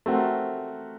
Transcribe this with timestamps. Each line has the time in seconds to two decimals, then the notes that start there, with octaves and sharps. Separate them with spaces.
0.06 A3 C4 F#4 A#4